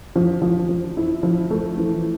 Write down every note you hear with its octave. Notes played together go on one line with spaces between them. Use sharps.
F3
F3
F3
E4
F3
A3
E3